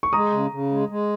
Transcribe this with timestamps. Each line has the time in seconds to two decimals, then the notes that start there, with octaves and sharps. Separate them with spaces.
0.03 C#6
0.13 G#3 A#5 D#6
0.32 C#3
0.51 C#3
0.71 G#3
0.89 G#3